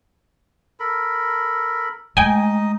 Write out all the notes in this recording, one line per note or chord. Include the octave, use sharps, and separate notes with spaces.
A4 A#4 B5
G#3 A3 D#4 D#5 G5 G#5 D#6